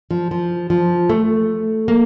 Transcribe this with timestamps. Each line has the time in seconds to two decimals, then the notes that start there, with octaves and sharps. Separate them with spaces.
0.11 F3
0.31 F3
0.70 F3
1.10 A3
1.88 A#3